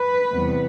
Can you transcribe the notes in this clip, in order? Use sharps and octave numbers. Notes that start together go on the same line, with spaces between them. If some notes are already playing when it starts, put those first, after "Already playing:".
Already playing: B4
E2 C3 G3 B3